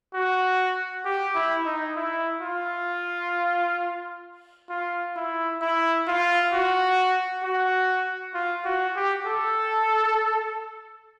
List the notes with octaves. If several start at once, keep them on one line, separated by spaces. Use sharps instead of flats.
F#4
G4
E4
D#4
E4
F4
F4
E4
E4
F4
F#4
F#4
F4
F#4
G4
A4